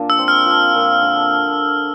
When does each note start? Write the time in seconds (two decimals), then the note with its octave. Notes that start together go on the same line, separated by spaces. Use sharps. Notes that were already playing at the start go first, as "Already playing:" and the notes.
Already playing: A#2 A#3 D4
0.10 E6
0.19 C4
0.28 F6
0.46 F3
0.74 A#2
1.02 D3